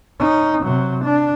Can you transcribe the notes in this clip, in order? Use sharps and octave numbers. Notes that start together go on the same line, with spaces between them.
C#4 D#4
C3 F#3
D4